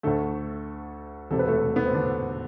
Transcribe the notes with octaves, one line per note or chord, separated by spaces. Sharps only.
D2 D3 A3 A4
E1 E2 C3 A4
B4
A3 A4
B3
C4
D3 D4